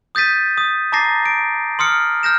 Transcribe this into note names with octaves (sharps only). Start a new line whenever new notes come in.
D#6 G6 A6 B6 D#7
D#6
A5 A#5 D6 A6 A#6 C7
D7
C6 D#6 F6 C#7
F6 G6 A#6 E7